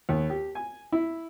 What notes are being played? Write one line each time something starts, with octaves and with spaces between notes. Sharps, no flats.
D#2
G4
G#5
E4